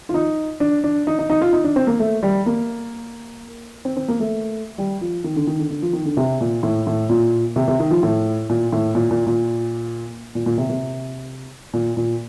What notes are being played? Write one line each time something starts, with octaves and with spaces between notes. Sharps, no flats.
F4
D#4
D4
D4
D#4
D#4
D#4
F4
D#4
D4
C4
A#3
A3
G3
A#3
C4
C4
A#3
A3
G3
F3
D#3
D3
D#3
D3
D3
F3
D#3
D3
C3
A#2
A2
A2
A#2
C3
C3
D#3
F3
A2
A#2
A2
A#2
A#2
A#2
A#2
A#2
C3
C3
A#2
A#2